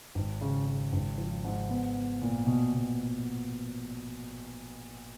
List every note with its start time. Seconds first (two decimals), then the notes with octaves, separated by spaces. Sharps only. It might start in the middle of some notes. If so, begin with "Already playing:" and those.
0.15 G#1
0.41 C#3
0.66 C#3
0.93 G#1
1.18 F3
1.45 G#2
1.69 B3
1.96 B3
2.21 A#2
2.46 B2
2.72 B2